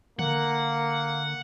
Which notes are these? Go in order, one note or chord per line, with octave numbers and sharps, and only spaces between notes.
D3 A#3 F#5